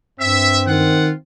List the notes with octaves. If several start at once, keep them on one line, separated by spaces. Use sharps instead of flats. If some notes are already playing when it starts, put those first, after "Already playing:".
G2 C4 E5
D#3 F4 F#5